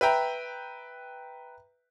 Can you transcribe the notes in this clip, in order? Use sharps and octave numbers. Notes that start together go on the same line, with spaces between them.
B4 E5 G5 A#5